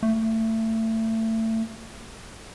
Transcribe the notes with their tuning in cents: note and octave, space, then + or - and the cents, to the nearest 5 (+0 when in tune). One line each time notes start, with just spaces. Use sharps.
A3 +25